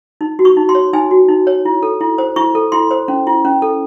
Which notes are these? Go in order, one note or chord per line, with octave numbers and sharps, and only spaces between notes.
D#4
F#4
C#6
D#4
C6
C#5
D#4 G#5
F#4
D#4
C#5
E4
A4
E4
C5
E4 C#6
A4
E4 C6
C5
C#4
E4
C#4
A4